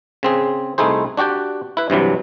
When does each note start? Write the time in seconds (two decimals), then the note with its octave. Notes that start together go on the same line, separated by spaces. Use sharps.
0.23 C#3 C4 G#4
0.78 C2 A3 D#4 E4 G#4 C5
1.17 D4 F#4 G4 D5 G5
1.77 E4 B4
1.90 G2 C3 E3 F#3